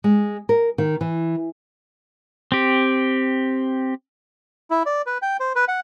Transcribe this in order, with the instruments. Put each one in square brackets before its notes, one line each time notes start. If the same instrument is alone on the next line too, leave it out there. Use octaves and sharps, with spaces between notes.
[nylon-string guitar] G#3
A#4
D#3
E3
[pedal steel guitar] C4 G4
[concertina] E4
D5
B4
G5
C5
B4
F#5